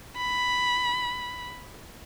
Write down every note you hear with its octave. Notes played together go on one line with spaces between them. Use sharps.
B5